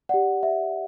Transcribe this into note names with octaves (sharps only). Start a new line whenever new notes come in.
G4 D5 F#5
E5